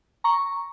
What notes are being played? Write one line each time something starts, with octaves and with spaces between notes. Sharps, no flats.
A#5 C#6